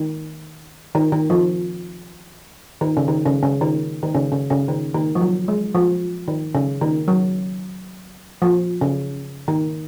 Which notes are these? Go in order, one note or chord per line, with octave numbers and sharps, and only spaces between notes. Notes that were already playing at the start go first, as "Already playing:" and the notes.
Already playing: D#3
D#3
D#3
F3
D#3
C#3
D#3
C#3
C#3
D#3
D#3
C#3
C#3
C#3
D#3
D#3
F3
F#3
G#3
F3
D#3
C#3
D#3
F#3
F3
C#3
D#3